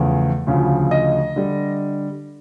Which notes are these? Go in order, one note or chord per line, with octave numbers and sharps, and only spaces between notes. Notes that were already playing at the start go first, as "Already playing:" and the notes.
Already playing: E2 C#3 F3 A3
D2 C#3 F3
D#5
D3 G3